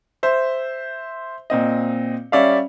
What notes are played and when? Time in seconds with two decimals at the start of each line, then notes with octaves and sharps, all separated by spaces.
0.23 C5 E5
1.50 A#2 C4 D#5
2.32 G3 C#4 D5 E5 F5